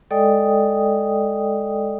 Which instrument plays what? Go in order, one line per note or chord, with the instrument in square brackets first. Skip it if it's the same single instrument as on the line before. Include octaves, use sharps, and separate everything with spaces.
[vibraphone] G#3 A4 D5 D#5 G5 D#6